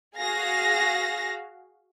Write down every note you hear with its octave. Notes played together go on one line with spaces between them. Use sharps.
F#4 G#4 F5 A#6